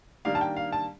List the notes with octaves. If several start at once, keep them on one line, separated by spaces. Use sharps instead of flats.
D#3 G3 A#3 D4 F5
A5
G5
F5
A5